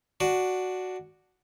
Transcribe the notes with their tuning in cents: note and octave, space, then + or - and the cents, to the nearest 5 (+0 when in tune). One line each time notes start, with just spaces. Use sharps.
D4 +0 F#4 +0